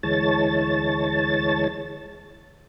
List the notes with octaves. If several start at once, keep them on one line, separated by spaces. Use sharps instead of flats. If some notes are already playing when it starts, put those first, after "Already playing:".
D2 E3 G#3 C#5 A5 A6